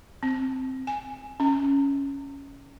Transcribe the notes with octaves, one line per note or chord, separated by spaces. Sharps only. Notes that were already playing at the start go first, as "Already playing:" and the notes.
C4
G#5
C#4